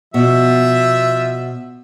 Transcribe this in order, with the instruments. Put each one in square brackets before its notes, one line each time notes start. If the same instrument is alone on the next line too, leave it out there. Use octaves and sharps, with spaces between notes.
[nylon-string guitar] B2 [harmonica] F3 E5